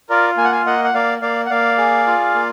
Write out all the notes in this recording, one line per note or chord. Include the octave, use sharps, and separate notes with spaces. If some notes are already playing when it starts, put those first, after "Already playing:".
F4 A#4 D5
A#3 G#5
F#5
F5 G#5
A#3 D#5 F#5
F#5
A#3 D5 F5
A#3 D5 F5
F#5
A#3 D5 F5
G#4
F4
A#3